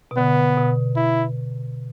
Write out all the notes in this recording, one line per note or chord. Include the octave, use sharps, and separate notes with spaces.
B2
D3 B3
B2
E4